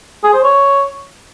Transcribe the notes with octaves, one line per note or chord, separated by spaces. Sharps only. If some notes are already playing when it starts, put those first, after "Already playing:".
G#4
C5
C#5